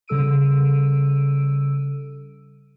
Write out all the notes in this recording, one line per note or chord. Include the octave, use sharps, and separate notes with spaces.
C#3 G3 A4 E6 D7 D#7